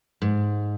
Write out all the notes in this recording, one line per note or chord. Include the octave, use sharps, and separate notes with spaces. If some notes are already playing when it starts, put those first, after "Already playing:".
G#2